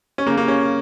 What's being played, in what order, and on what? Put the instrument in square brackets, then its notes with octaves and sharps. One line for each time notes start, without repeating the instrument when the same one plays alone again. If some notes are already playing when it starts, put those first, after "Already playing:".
[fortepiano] C#4
C#3 A#3
A#3
C#4